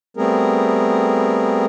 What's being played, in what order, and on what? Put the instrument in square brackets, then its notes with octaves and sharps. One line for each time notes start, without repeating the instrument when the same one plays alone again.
[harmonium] G3 A3 B3 C4 G#4 A#4